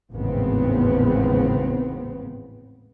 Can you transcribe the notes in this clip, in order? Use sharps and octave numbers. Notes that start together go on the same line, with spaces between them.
G#1 E2 A2 C#3 B3 C4